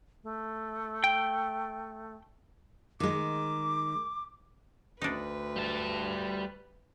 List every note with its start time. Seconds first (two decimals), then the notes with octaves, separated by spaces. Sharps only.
0.23 A3
1.04 G5
3.00 D#3 G#3 D6
5.02 D2 D4 D#4 B4
5.56 G3 A5